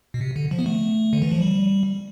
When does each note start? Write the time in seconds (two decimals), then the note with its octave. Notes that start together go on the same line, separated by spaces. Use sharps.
0.14 B2
0.21 C3
0.36 D3
0.51 F3
0.59 B3
0.66 A3
1.13 D3
1.22 E3
1.32 F3
1.41 G3